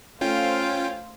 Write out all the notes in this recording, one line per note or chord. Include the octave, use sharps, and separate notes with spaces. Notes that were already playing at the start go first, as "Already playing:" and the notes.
A3 C#4 F4 C5 F5 G5